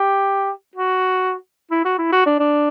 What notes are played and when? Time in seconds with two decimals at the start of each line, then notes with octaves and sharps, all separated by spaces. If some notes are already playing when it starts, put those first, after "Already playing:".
Already playing: G4
0.76 F#4
1.71 E4
1.85 F#4
1.98 E4
2.12 F#4
2.26 D4
2.40 D4